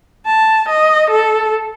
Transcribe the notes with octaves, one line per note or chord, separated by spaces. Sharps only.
A5
D#5
A4